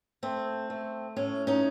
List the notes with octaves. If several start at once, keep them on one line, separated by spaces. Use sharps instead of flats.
A3 C4
A3
A2 C#4
C#4 D#4